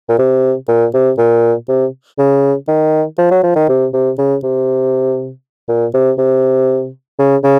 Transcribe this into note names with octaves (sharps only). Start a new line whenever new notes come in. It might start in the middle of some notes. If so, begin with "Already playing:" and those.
A#2
C3
A#2
C3
A#2
C3
C#3
D#3
F3
F#3
F3
D#3
C3
C3
C#3
C3
A#2
C3
C3
C#3
C#3